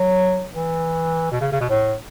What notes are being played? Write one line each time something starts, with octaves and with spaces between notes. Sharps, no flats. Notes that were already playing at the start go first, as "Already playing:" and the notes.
Already playing: F#3
E3
B2
C#3
C#3
B2
A2